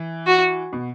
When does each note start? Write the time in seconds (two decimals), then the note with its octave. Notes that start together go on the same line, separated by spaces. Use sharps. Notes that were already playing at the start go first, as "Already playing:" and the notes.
Already playing: E3
0.27 F#4
0.73 B2